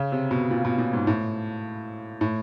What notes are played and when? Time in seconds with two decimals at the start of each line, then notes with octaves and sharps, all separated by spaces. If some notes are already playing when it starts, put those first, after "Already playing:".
Already playing: C#3
0.12 C3
0.31 B2
0.51 A#2
0.65 B2
0.78 A#2
0.93 G#2
1.07 A2
2.21 A2